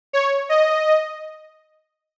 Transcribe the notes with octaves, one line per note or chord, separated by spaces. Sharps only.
C#5
D#5